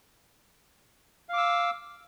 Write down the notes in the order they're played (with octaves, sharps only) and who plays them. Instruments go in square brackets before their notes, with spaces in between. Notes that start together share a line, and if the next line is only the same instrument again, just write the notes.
[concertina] F5
D6
E6